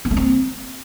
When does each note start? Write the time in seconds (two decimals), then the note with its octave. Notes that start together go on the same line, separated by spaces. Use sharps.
0.05 B3
0.11 A3
0.17 C4